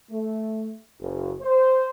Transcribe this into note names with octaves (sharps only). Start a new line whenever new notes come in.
A3
F#1
C5